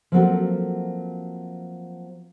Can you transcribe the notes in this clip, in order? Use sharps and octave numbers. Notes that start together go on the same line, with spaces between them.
F3 F#3 A#3 C4 F#4 A4